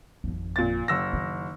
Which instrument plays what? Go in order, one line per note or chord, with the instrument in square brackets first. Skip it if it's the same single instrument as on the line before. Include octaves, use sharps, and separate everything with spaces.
[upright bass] G#1 F2
[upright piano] A#2 A6
F#1 E6 A#6
[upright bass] D#3